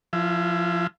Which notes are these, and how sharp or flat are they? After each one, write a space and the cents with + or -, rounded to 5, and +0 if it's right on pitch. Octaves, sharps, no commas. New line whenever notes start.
F3 +0 E4 +30